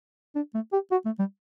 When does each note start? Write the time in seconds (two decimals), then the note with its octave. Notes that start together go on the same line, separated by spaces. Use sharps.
0.35 D4
0.54 A3
0.73 G4
0.91 F#4
1.05 A3
1.19 G3